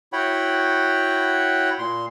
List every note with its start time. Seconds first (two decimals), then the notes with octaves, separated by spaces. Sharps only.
0.13 E4 F#4 C#5 F#5 G5 B5
1.79 A#2 C6